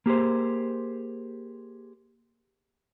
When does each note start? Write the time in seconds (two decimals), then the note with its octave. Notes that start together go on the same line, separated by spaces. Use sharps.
0.06 A#3 G4 G#4 C5